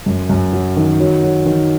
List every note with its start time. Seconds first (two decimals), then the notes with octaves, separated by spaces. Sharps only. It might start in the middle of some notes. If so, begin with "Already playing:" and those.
0.06 F#2
0.29 F#2
0.53 F#3
0.76 D#3
1.00 F#3
1.23 F#3
1.46 D#3